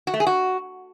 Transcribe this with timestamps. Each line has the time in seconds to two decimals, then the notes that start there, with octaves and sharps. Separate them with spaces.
0.07 F#4
0.14 A3
0.20 G#4
0.27 F#4